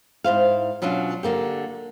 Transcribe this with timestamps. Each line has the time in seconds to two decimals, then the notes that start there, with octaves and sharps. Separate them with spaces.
0.24 G#2 E4 C5 F5
0.82 B2 F#3 C#4 D4 F4
1.23 D3 A#3 G4